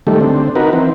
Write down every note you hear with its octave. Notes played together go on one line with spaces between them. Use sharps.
D#3 G3 A3
D3 C4
D#4 F#4 A#4 B4
E3 C4